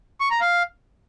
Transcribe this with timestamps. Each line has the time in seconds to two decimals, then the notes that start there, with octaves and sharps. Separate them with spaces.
0.21 C#6
0.31 A#5
0.41 F5